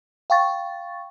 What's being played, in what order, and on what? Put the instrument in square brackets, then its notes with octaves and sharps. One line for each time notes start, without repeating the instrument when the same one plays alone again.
[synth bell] F5 G5 C#6 A6